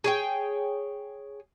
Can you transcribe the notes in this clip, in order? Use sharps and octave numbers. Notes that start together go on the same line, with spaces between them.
G#4 C#5 G5